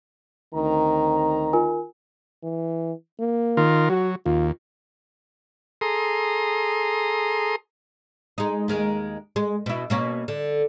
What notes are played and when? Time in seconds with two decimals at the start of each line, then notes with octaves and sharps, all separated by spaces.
0.54 D2 D#3 C4 A#5
1.53 F4 A#4 G#5
2.43 E3
3.20 A#3
3.57 D#3 F4 A#4
3.90 F#3 F#4
4.26 D#2 F4
5.81 G#4 A4 A#5 C6 D#6
8.38 G#3 D#4
8.68 D#2 G#3 A#4
9.36 G#3
9.66 B2 E4
9.90 B2 A#3 C#4
10.28 D3